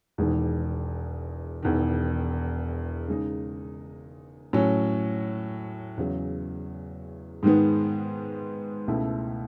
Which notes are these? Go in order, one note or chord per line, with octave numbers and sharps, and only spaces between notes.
E1 E2 D#3 G#3 D#4
E1 E2 D#3
C#3 G#3 D#4
A2 F#3 C#4
E2 C#3 F#3
G#2 D#3 G#3 B3
C#2 B2 A3 E4 A4